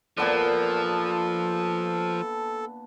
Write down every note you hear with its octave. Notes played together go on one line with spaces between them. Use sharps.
A#2 F3 B3 D4 A4